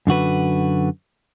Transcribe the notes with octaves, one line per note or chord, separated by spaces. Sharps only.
F#2 D3 F#4 B4